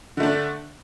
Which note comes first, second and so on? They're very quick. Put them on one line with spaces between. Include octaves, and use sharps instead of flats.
D3 A3 D4